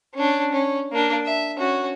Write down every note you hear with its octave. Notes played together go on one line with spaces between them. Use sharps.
C#4 D4
C#4
A#3 D4
E5
C#4 F#4